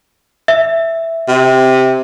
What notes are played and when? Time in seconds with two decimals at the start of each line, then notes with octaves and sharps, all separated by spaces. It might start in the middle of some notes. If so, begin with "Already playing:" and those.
0.48 E5
1.28 C3